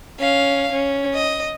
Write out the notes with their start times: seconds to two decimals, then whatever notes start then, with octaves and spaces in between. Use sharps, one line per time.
0.19 C#4 F5
0.72 C#4
1.14 D#5